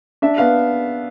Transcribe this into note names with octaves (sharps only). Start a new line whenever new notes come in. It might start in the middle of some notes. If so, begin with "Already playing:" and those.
D4 E5
B3 F5